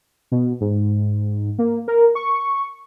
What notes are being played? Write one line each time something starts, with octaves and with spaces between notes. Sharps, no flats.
B2
G#2
A#3
A#4
C#6